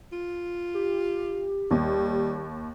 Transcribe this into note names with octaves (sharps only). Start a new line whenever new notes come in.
F4
G4
D#2 G3